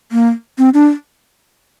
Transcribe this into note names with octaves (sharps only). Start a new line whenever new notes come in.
A#3
C4
D4